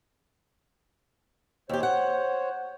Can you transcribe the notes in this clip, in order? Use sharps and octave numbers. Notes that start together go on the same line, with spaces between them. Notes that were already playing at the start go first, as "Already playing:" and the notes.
D#2 G4 C5 C#5
F#5